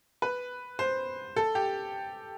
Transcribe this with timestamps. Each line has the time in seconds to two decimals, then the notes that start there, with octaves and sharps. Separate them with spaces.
0.22 B4
0.79 C5
1.36 A4
1.55 G4